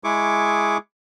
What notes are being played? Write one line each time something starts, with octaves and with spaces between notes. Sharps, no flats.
G#3 E4 G#4 C#6 D6